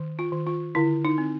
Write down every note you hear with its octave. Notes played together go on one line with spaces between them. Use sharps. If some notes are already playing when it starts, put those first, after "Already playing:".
Already playing: D#3
F4
D#3
F4
D3 E4
D#4
C4